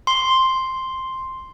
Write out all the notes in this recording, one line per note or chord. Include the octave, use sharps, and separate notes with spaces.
C6